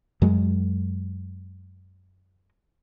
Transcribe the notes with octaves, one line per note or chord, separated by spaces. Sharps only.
F#2 F#3 G#3